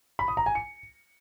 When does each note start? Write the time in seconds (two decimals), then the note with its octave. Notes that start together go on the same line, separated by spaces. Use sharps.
0.19 B5
0.28 D#6
0.37 A#5
0.46 G#5
0.55 C#7